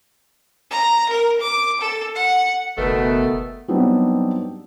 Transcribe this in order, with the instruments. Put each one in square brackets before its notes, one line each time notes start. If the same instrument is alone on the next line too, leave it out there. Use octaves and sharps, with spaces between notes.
[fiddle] A#5
A#4
D6
A4
F#5
[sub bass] F#1 [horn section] B2 D#3 A3 [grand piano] B3
[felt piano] F#3 G3 B3 C4 D4 D#4